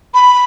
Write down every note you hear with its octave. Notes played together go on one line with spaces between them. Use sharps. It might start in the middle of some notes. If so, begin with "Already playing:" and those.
B5